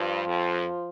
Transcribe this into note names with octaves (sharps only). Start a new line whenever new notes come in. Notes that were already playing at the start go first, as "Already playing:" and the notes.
Already playing: G2 F3
F2